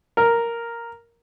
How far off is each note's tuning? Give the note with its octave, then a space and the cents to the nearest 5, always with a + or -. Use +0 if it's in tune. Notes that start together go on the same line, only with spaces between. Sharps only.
A#4 +0